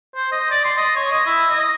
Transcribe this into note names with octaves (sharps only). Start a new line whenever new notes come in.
C5
D#5
D5
C6
D#5
C#5
D#5
E4
D#5